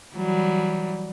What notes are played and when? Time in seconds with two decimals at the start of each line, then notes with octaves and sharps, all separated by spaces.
0.15 E3 F#3 G3